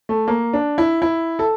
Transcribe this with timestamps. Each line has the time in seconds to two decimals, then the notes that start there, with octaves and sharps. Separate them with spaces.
0.09 A3
0.28 A#3
0.54 D4
0.78 E4
1.02 E4
1.39 A4